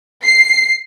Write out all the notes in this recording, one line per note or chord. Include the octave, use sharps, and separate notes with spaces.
C7